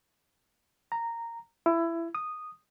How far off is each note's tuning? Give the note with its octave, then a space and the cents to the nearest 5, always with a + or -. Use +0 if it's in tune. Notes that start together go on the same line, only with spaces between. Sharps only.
A#5 -10
E4 +20
D#6 -10